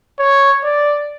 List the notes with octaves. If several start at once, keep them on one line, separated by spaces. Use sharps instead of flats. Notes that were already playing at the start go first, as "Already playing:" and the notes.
C#5
D5